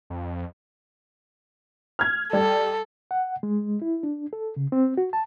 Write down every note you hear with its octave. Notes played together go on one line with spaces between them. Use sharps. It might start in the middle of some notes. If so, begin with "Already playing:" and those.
F2
F6 G#6
G3 A4
F#5
G#3
E4
D4
A4
C#3
C4
F#4
A5